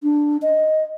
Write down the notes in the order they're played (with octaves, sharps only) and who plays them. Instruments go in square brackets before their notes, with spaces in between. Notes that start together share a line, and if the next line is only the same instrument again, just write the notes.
[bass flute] D4
D#5